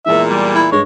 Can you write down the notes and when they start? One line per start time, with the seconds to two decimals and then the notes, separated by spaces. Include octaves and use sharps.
0.06 E2 A#2 E3 G#3 A#4 E5
0.30 G3
0.55 E4
0.72 G2 G#3 C#5